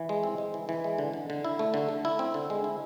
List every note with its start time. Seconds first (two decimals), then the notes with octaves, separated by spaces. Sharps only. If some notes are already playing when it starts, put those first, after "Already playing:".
Already playing: E3
0.09 G#3
0.23 C4
0.38 G#3
0.54 E3
0.69 E3
0.84 G#3
0.98 D3
1.13 D3
1.30 D3
1.45 E4
1.59 A3
1.74 D3
1.89 A3
2.05 E4
2.19 C4
2.34 D3
2.50 G#3
2.64 E4